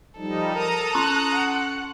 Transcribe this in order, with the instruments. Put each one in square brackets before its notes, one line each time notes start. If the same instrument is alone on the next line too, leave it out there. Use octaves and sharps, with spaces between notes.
[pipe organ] F3 G3 D#4 [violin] A4
[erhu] A#4 [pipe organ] A#5 D#6
[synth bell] C#4 C6 C#6 [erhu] F#6
[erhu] F#5